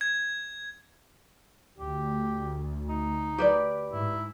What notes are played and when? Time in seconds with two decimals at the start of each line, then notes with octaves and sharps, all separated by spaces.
0.01 G#6
1.78 D2 G4
2.89 D#4
3.38 G4 B4 D5
3.92 G#2 E4